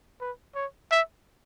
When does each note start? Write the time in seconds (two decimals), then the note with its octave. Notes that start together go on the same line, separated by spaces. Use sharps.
0.21 B4
0.55 C#5
0.91 E5